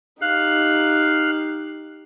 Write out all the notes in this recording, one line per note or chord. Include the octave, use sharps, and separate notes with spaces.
D#4 G4 F5 F#6